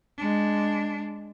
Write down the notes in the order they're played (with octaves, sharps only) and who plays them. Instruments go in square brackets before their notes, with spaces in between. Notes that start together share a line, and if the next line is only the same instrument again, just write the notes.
[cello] G#3 D4